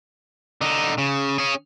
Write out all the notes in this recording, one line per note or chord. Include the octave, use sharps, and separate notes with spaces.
D3 D#4
C#3
C#4 G#4